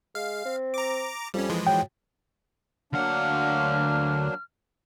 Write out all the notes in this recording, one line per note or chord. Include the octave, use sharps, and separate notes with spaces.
G#3 F5
C4
A#5 D6
F2 G3 C#4
E3 F3 G#3
F#3 G5
D2 F#3 A#3 D4 F#5 F6